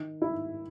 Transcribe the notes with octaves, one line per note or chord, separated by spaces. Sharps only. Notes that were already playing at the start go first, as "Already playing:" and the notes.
Already playing: D#3
E4